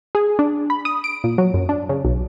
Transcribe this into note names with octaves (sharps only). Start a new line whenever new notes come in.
G#4
D4
B5
D#6
D7
A#2
F#3
F#2
D4
C#3
B1